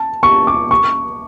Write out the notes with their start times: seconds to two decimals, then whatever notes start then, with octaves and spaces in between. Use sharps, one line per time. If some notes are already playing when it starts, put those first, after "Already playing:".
Already playing: A5
0.23 C#6
0.47 D6
0.71 C#6